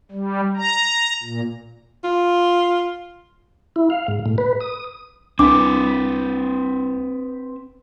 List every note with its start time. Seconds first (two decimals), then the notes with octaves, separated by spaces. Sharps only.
0.12 G3
0.57 A#5
1.23 A#2
2.04 F4
3.76 E4
3.90 F5
4.08 G#2
4.26 A2
4.38 B4
4.61 D#6
5.39 C2 C4 D4 B4 D6